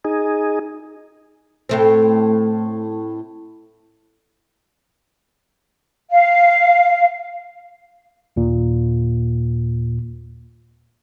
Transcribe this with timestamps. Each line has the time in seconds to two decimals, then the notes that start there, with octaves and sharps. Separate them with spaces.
0.05 D#4 G#4
1.69 A2 A3 C4
6.12 F5
8.36 D#2 A#2